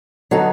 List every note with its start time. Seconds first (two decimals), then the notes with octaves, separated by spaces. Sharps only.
0.31 D3 F#3 B3 D#4